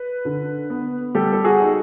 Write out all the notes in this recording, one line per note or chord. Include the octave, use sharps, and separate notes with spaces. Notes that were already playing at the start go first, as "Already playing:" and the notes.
Already playing: B4
D3
B3
G3 G4 A4
A4
F#4 G#4
D#4